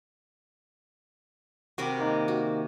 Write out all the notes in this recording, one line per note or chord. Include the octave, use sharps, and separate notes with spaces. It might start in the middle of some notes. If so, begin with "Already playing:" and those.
C3 F#4 G4 A#4 B5
D#3 A#3 D#4
F#4